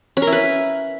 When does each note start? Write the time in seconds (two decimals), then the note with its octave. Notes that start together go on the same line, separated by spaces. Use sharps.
0.17 C#4
0.22 A#4
0.27 E4
0.32 B4